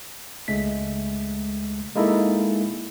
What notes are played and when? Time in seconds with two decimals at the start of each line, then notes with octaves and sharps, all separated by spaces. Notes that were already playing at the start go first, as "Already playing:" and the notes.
0.48 C#2 G#3 A3 B6
1.96 G#3 A#3 D#4 E4 A4